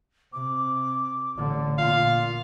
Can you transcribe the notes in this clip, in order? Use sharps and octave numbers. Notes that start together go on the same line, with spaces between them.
C3 D6
A1 D3
A#2 F4 F5